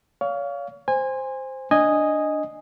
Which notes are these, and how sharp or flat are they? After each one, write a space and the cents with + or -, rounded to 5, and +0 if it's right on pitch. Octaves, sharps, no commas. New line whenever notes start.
C#5 +35 F5 +0
C5 +0 G#5 -25
D4 +0 D#5 +0 G#5 -10